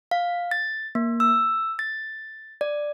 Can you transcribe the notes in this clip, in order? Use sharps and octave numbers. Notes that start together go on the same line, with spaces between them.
F5
A6
A#3
E6
A6
D5